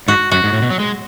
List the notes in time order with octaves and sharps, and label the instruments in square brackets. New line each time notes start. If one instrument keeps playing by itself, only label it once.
[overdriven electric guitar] G#2 [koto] F#4
[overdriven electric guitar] F#2 [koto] F#4
[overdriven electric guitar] G#2
A2
B2
F#3
G#3